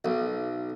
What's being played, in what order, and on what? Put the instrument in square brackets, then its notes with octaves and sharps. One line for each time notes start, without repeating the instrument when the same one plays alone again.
[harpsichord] B1